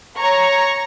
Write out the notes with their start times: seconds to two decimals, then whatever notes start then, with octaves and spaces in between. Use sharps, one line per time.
0.17 C#5 A#5 C#6